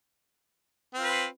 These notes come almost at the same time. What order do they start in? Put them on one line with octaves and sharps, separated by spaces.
C4 F4 B4